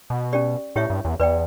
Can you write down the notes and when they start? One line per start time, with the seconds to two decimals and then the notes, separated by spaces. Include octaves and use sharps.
0.10 B2
0.33 C#4 G4 D5
0.76 A2 E4 G4 C#5 E5
0.90 G2
1.05 E2
1.20 E2 B4 D5 G5